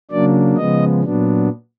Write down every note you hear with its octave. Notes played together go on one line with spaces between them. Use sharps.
C#3 F#3 A#3 D4 D5
C#3 F3 G#3 B3 D#5
A#2 F#3 B3 D4